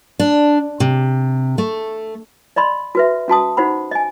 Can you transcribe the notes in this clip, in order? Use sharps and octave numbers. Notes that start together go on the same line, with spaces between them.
D4
C3
A3
D5 D#5 B5 C6
F#4 B4 E5
C#4 F#4 A5 D#6
D#4 F#4 C5 F#5 B5
D#5 G#5